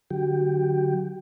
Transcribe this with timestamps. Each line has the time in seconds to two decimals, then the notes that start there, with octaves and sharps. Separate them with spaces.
0.11 D3 F#3 F#4 G4 G5